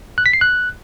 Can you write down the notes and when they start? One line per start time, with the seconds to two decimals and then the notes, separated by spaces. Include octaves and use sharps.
0.18 F#6
0.26 B6
0.33 C7
0.41 F#6